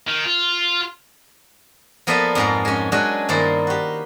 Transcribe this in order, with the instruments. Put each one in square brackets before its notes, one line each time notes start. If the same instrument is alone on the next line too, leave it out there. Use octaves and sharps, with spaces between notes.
[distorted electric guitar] D#3
F4
[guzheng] F3 A#3 B3 A4 D5 E5
F2 G#2 A#4
G#3 C#4
F#3 G#3 C#4 D4 F#4
G2 D#3 A#3 E4 C5 D5
F#4 G4